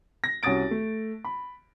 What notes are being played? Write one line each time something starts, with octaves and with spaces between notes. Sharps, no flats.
A#6
C2 C#4 F#4 D#6 A6 D7
A3
B5